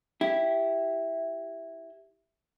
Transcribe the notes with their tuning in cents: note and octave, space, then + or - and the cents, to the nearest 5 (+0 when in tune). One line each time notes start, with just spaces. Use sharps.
E4 +0 G4 +0